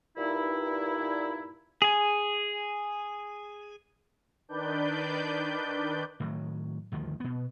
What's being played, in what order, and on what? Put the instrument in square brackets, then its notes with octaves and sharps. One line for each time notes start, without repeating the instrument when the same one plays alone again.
[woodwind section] G2 A#2 D#4 E4
[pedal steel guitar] G#4 G#5
[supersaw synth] D#3 D4 B4 D5 G6
[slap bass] A2 D#3 F#3
G1 D2 D#3 F3
B2 B3